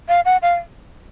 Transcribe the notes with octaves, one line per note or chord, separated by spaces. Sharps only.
F5
F#5
F5